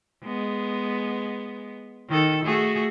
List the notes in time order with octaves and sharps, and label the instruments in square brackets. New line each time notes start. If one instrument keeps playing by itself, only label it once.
[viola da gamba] G#3 B3
D#3 D#4 A4
A3 F#4 G#4